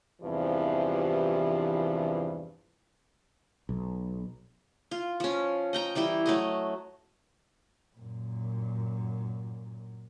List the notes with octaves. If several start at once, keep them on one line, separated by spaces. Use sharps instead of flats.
E2 G2 C3 E3 F3
B1
F4
F3 C#4
D#5 G5 A#5
E3 G3 E4 G5
F#3 A3 D#5
F#2 A#2